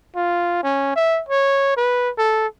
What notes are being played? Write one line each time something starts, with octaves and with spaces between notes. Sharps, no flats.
F4
C#4
E5
C#5
B4
A4